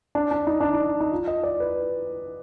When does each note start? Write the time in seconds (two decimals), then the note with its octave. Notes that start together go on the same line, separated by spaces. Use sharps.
0.15 D4
0.31 D4
0.47 D#4
0.60 D4
0.74 D#4
1.01 D#4
1.12 F4
1.28 D#5
1.44 D5
1.60 B4